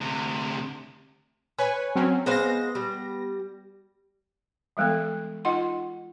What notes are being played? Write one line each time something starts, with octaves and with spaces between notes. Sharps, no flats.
D2 C3
B4 C#5 G#5
F#3 C4 C#4
G#3 B3 C5 F5 A#6
G3
E3 G3 G#3 B3 A4
D#4 F4 D#5 F#5 C6